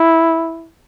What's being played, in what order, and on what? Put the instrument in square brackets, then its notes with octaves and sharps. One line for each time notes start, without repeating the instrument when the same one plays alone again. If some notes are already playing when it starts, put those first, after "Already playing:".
Already playing: [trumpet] E4